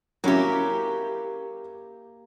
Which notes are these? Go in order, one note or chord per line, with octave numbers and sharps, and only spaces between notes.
F#3 A#3 C#4 E4 G4